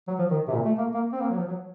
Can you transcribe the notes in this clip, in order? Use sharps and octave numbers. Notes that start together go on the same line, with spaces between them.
F#3
F3
D#3
C3
A#2
A3
A#3
A#3
C4
A#3
F#3
F3
F#3